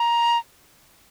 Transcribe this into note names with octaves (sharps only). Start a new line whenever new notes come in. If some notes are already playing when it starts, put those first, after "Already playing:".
Already playing: A#5